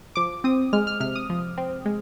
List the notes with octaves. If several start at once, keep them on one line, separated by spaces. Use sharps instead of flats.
F3 D6
C4 D#6
G#3 F6
F6
C3 F6
D#6
F3
C4
G#3